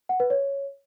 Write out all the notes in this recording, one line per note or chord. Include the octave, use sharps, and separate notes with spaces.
F#5
B4
C#5